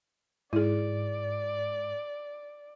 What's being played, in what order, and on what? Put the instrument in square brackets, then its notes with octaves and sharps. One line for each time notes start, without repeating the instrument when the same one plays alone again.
[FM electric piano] G#2 [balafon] E4 G#4 [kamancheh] D5